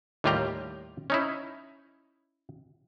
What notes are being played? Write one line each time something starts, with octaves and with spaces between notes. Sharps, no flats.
D#2 A2 G3 F4 G4 A#5
C#4 D#4 E4